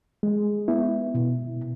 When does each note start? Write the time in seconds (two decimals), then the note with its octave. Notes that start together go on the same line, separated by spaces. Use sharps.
0.23 G#3
0.68 B3 E4
1.14 B2